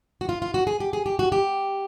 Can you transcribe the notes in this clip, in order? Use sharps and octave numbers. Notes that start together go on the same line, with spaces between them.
F#4
F4
F4
F#4
G#4
G4
G#4
G4
F#4
G4